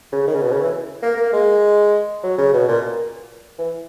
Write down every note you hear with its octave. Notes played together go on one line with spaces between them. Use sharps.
C#3
D#3
C#3
B2
C#3
E3
A#3
A#3
G#3
F#3
C#3
B2
A#2
E3